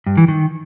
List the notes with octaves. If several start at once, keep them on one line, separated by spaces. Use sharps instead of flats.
G2
E3
D#3